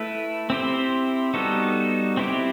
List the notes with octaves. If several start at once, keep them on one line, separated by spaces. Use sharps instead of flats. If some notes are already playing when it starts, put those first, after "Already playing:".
Already playing: A3 E4 B4
C4 E4 G4 C5
G3 B3 D#4 F#4 A4
C4 E4 G4